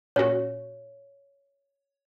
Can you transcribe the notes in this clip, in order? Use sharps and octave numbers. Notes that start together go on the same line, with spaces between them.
A#2 C#4 F#4 C#5